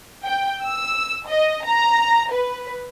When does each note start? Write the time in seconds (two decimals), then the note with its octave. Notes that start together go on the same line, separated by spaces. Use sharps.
0.25 G5
0.63 E6
1.27 D#5
1.65 A#5
2.31 B4